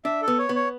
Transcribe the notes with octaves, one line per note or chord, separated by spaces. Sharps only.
D4 E5
A4
B3
C#5
B3
C#5